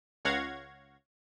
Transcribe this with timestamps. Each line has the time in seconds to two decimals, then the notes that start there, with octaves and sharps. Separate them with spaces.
0.25 C#2 C#5 F5 F#5 G#6 A#6